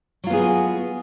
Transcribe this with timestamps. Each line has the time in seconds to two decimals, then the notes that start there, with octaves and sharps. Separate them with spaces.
0.24 F#3
0.27 F4
0.30 B3
0.33 G#4